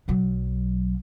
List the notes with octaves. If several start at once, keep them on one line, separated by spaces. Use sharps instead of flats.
B1 F#3